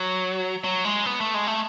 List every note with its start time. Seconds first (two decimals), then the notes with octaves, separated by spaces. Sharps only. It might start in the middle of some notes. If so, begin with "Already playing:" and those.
Already playing: F#3
0.64 F#3
0.85 G#3
1.06 B3
1.21 A3
1.34 G#3
1.47 A3